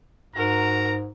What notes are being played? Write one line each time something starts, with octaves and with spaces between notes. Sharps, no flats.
G#2 F#4 A#4 A#5